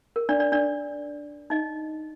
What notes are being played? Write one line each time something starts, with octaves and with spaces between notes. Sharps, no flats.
A#4
D4 D5
D4 D5
D4 D5
D#4 D#5